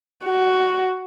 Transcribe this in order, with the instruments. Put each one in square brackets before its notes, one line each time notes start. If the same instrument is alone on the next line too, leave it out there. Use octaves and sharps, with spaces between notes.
[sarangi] F#4